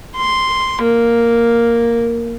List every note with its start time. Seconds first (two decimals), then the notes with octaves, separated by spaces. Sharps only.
0.16 C6
0.83 A#3